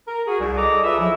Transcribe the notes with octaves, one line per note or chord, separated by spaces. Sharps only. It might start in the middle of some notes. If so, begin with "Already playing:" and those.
A#4
F#4 G#4
C2
A4 D5 D#5 A#5 D6 D#6
F4 G#4 B4 E5
F3 F#3 E4